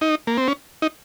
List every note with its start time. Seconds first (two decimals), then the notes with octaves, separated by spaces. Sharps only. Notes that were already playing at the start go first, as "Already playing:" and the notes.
0.01 D#4
0.27 A#3
0.38 C4
0.48 C#4
0.82 D#4